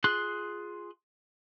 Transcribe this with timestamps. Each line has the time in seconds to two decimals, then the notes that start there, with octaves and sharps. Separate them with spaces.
0.04 F4 G#4 C6 F#6